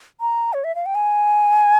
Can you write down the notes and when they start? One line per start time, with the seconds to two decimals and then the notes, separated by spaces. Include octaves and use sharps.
0.21 A#5
0.53 C#5
0.64 E5
0.75 F5
0.86 G5
0.95 G#5